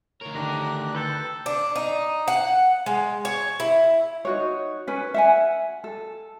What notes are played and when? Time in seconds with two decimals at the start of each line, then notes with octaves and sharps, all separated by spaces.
0.21 D2 A#4 C#5
0.35 D3 D#3 D4 G4 A#5 F#6
0.95 A4 B4 G5 A5
1.46 D4
1.76 D#4
2.28 F#5
2.86 G#3
3.25 C#5
3.60 E4
4.25 D#4 F#4 C#5
4.87 C#4 B4
5.14 E5 F#5 G#5
5.84 A4